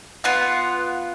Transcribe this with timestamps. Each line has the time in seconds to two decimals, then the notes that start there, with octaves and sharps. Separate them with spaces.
0.24 B3 F4 F#5